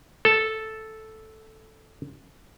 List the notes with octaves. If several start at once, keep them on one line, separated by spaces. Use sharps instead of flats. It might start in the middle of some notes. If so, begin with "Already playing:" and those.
A4 A5